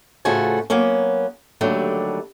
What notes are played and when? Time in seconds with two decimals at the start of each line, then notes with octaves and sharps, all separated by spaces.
0.25 A2 C#3 F3 A3 F#4 G#5
0.70 F#3 A#3 B3 C#4
1.61 D#2 D3 F#3 G3 A3